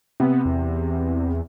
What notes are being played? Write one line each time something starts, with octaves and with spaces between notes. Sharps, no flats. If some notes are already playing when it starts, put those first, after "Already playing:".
C3 B3
E2